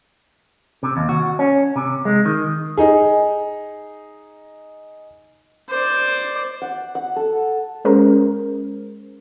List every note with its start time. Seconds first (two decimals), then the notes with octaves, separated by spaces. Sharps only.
0.83 C3
0.97 D#2
1.09 F#4
1.39 C#4
1.76 C3
2.05 G#3
2.25 D#3
2.77 D#4 G#4
5.70 C5 D5
6.62 F#5
6.95 F#5
7.16 A4
7.85 G#3 C#4 G#4 A#4 C5